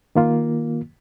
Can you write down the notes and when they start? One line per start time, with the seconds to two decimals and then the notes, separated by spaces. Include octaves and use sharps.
0.15 D#3 A#3 F4